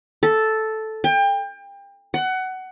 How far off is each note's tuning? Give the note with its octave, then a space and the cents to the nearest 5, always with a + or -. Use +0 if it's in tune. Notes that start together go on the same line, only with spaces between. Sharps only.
A4 -5
G5 +30
F#5 +20